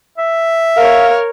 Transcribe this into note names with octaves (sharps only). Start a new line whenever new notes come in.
E5
A#4 C#5 F5